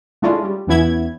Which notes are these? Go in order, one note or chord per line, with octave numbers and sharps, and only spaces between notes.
G#3 A3 C#4 D4 E4 F4
G3
E2 E3 B3 C#4 E4 G#6